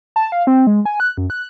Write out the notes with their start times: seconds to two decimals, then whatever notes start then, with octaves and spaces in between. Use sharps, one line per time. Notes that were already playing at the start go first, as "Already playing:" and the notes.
0.16 A5
0.32 F5
0.47 C4
0.67 G#3
0.85 G#5
1.00 F#6
1.17 F#2
1.30 F#6